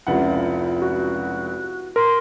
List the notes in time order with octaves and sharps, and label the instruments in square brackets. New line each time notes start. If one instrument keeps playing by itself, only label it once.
[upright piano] F1 C#2 F#5 [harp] E4 F4
[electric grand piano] F#4 [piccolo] F#6
[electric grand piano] A#4 [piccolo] C6